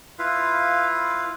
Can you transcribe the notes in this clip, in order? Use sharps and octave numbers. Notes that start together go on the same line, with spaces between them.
E4 F4 B4 F5